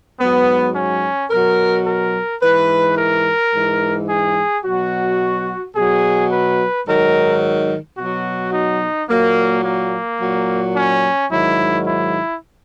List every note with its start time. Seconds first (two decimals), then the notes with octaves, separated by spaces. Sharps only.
0.20 G#2 F#3 B3
0.75 C#4
1.31 B2 F#3 A#4
1.86 A#4
2.42 G#2 E3 B4
2.97 A#4
3.53 G#2 E3
4.09 G#4
4.64 B2 F#3 F#4
5.76 B2 F#3 G#4
6.31 B4
6.86 G#2 D#3 F#3 A#4
7.98 B2 F#3 F#4
8.53 D#4
9.09 A#2 F#3 A#3
9.65 A#3
10.20 A#2 F#3
10.76 C#4
11.31 G#2 D#3 F#3 E4
11.87 E4